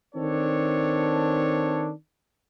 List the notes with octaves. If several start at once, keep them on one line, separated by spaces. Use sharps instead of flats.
D#3 C4 D4 A4 C#5